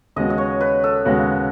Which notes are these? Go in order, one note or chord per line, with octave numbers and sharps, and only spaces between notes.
D#2 C#3 G#3 B3 F#4 D#5
D#5
C#5
B4
A4
D#2 C#3 G#3 B3 F#4